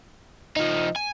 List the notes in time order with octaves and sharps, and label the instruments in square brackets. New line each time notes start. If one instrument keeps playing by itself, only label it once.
[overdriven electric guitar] F3 D#4 [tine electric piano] D#5
[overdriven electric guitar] G#5